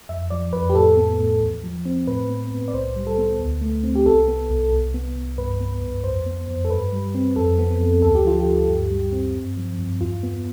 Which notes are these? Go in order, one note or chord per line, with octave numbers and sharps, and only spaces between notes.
F2 E5
F3 D5
F2 B4
G4
A2 A4
B3
A2
E2
F3
C4
A2 B4
B3
A2
D5
C2 C5
G3
A4
B3
D2
A3
C4
G4
C2 A4
B3
C2
C2
B3
C2
G2 B4
B3
G2
F2 C5
B3
F2
A4
G2 B4
G3
C4
F2 A4
B3
F2
D2 A4
G4
F3 F4
G4
D2
G2
G3
C4
G2
F3
G2
E2 F4
B3